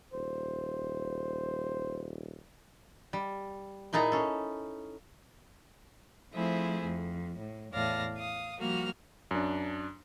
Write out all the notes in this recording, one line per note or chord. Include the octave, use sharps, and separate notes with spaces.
D#1 C5
G3
A#2 D#4 E4 G#4 A4 A#5
C#4 A4
F3 A3 C4 E4 G#4
F2
A2
E2 A2 D5 F5 A5 A#6
F5 D#6
F3 G3 A#3 F#4 F6
F#2 D4